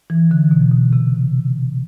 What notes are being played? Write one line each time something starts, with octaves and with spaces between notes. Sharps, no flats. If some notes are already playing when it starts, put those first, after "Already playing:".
E3
D3
B2
B2
C3